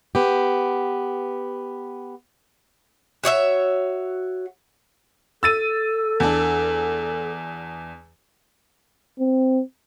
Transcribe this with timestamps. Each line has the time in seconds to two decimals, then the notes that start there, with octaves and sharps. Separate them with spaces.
0.15 B3 G4
3.24 F#4 C#5 D5 E5
5.43 A4 E6 A6 D#7
6.20 E2 D4
9.20 C4